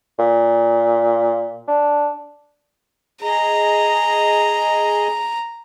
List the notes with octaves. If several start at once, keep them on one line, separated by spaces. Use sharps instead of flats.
A#2
D4
G#4 D#5 A#5